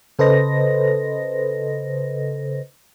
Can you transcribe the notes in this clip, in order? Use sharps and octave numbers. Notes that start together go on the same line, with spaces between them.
C#3 A4 B4 C5 D#5 A#6